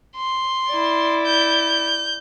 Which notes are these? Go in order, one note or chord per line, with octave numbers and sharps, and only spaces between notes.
C6
E4 D5
G6